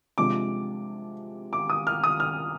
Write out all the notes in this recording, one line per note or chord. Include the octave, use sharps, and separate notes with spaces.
C3 F3 G#3 D4 D6
D6
D#6
F6
D#6
F6